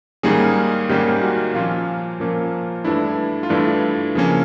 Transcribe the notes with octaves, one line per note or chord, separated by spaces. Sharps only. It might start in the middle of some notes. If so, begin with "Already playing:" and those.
G#2 D#3 G3 A#3 C#4 G#4
G#2 D#3 G3 A#3 C#4 G4
F#4
A#2 F3 A#3 C#4 F4
A#2 F3 A#3 C#4
G2 E3 A3 D4 E4
F4
G2 E3 A3 D4 E4
C#3 F3 A#3 C#4